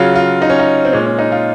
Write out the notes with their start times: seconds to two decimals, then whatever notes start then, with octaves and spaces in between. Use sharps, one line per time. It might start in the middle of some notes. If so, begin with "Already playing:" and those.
Already playing: C#3 F#3 F4
0.15 F4
0.42 D#4
0.50 C#4
0.59 D#4
0.85 C4
0.93 A#2 G#3 C#4
1.06 C#4
1.19 D#4
1.32 F4